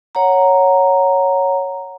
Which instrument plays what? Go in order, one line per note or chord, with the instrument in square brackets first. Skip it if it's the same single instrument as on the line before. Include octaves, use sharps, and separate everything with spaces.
[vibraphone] C#5 F#5 A#5